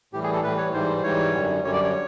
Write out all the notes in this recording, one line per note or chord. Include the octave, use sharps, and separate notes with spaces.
A2 E3 G3 G4
G#4
A4
A2 E3 G3 B4
C#5
G#2 E3 G3 C5
C5
G#2 E3 G3 C#5
F#2 D3 G3
F#2 D3 G3 C#5
D5
C#5